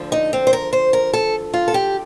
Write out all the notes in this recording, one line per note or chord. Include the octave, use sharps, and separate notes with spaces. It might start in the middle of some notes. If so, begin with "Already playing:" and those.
Already playing: D2 D3 F3
D#4
C4
C5
A#4
C5
A#4
A4
F4
A4
G4